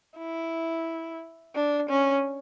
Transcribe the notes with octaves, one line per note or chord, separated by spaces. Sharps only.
E4
D4
C#4